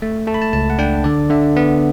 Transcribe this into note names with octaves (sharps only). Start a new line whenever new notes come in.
A3
A3 A5
B5
A5
C#2 A5
F#5
D4 G5
D3 D5
D3 E5
B3